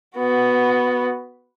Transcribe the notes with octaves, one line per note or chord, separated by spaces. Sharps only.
B3 F#4